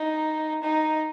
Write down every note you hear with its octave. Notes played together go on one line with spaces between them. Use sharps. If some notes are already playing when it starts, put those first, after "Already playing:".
Already playing: D#4
D#4